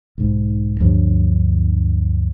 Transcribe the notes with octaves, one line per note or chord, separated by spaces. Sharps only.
B1 G#2
D2 G2 F3 F#3